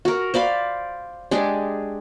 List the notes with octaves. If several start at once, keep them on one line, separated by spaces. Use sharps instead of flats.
F#4 A#4
C5 D5 F5 B5
G#3 D4 G4 G#4